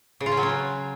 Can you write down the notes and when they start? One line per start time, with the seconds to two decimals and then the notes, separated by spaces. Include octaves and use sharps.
0.20 C#3
0.26 F4
0.32 C#4
0.37 F#3
0.43 C#4